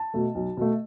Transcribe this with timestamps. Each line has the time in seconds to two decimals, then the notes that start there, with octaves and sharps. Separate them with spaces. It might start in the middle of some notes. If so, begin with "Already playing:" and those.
Already playing: A5
0.14 B2 A3
0.35 B1
0.57 B2 A3